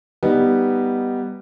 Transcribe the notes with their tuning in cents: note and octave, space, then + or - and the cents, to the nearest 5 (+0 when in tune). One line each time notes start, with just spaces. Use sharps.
G3 +0 B3 +0 D#4 +0